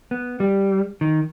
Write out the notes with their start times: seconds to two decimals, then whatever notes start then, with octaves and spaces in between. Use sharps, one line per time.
0.11 B3
0.40 G3
1.01 D#3